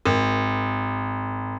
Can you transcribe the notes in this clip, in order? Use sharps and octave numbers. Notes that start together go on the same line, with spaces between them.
G#1